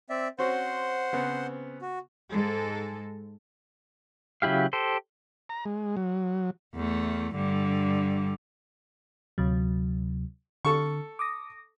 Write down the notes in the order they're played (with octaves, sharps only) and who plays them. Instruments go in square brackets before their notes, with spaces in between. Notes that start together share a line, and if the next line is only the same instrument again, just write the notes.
[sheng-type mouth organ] C4 D5 E5
[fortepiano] C4 C#4 F#4 [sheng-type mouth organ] C5 F#5 C6
[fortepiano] C#3 B3 C4
[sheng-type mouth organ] F#4
[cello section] G#2 G#3 A4
[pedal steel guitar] C#3 F#3 E4 G4 F5
G4 A4 C5
[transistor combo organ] A#5
G#3
F#3
[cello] E2 A3
G2 D3
[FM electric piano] D2 C3 F#3
[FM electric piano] D3 [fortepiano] A4 C#6
[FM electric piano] D6 D#6 A#6